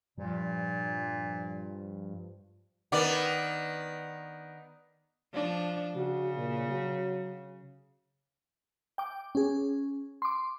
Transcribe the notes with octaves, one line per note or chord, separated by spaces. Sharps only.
G2 A#2 F3
D#3 B3 D5
F3 D4
C#3 F#4
A#2
F#3
G5 D6
C#4 G#4
C6 D6